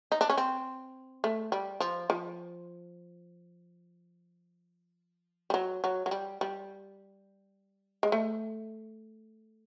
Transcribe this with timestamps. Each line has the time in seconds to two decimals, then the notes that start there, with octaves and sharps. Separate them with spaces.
0.12 D#4
0.21 D4
0.30 C#4
0.37 C4
1.24 A3
1.52 G3
1.80 F3
2.10 F3
5.50 G3
5.54 F#3
5.84 F#3
6.06 F#3
6.11 G3
6.41 G3
8.03 G#3
8.12 A3